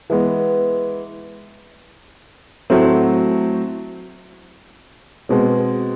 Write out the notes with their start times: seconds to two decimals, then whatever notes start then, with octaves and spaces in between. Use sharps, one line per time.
0.10 E3 G#3 B3
2.70 A2 F#3 A3 C4
5.29 B2 G#3 C4